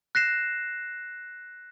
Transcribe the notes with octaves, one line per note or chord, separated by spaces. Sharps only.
F#6 A#6 C7 E7